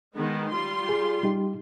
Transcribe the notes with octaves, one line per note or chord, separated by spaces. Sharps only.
D#3 G#3 B3
G3 F4 C6
G#4
G3 D#4 G4